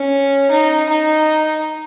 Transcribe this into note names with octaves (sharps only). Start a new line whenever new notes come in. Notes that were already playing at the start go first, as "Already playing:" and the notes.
Already playing: C#4
D#4
D#4